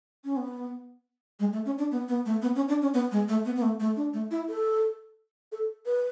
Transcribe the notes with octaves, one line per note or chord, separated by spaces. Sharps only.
C#4
B3
G#3
A3
C#4
D4
B3
B3
A3
B3
C#4
D4
C#4
B3
G#3
A3
B3
B3
A3
A3
D4
A3
E4
A4
A4
B4